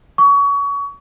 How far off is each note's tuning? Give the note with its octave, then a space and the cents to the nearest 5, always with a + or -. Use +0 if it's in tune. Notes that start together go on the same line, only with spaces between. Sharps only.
C#6 +30